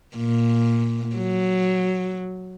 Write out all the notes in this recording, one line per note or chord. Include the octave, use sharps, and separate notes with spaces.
A#2
F#3